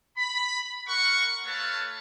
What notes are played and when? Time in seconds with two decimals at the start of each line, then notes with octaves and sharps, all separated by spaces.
0.17 B5
0.87 A#4 F#5 C#6
1.44 A3 F4 B4 C#5 F5 A5